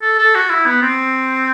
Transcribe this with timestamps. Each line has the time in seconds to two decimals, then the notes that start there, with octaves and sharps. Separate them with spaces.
0.02 A4
0.19 A4
0.35 F#4
0.50 E4
0.66 B3
0.82 C4